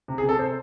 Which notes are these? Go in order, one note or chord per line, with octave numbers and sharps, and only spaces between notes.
C3
G#4
C3 A4
C5